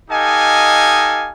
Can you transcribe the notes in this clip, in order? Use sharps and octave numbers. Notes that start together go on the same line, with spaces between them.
D#4 G4 A4 D#5 F5 G#5